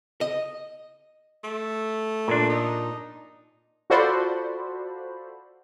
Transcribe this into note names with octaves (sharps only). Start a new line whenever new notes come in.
D#5
A3
A#2 D4
D#4
F4 F#4 A4 C5 D5 B5